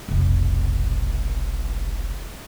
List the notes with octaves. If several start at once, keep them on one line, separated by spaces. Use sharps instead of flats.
F1 B1